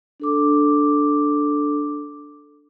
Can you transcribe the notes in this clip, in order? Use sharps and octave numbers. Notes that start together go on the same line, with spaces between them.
D4 A4 D6